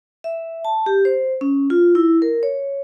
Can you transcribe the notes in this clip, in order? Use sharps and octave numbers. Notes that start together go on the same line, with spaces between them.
E5
A5
G4
C5
C#4
F4
E4
A#4
C#5